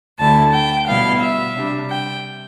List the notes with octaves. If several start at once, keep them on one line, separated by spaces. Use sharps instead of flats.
D2 D3 A3 E4 A5
G5
B2 G3 B3 E4 F5
E5
C3 G3 D4
G5